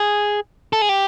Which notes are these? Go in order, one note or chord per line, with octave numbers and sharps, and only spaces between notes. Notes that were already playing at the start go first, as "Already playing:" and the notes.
Already playing: G#4
A4
G#4
G4